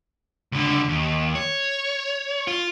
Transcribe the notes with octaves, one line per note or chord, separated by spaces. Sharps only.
C#2 D3
D#2
C#5
F4